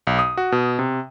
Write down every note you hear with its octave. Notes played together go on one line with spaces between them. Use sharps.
B1
D#6
F#4
B2
C3